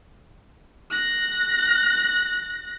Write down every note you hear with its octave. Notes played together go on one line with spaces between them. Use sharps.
F#6 A#6